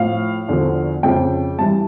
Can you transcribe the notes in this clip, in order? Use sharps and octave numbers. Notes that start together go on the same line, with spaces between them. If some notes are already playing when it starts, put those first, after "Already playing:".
Already playing: A2 F3 F5
E2 D3 F3
F2 C#3 F3 G5
G2 E3 A5